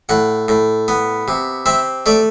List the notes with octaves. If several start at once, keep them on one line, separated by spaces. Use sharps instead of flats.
A2 F#5
A2
B3
C3
C4 E5
A3 D5